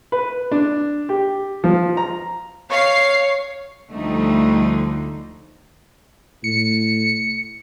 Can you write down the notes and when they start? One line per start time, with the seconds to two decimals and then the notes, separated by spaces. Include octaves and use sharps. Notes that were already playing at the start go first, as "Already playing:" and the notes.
0.12 B4
0.52 D4
1.09 G4
1.64 F3
1.97 A#5
2.70 C#5 F5 C7
3.92 D2 D3 F3 G3 A3 D#4
6.44 A2 C#7